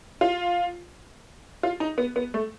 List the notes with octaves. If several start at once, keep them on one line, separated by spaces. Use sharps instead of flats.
F4
F4
D#4
B3
B3
A3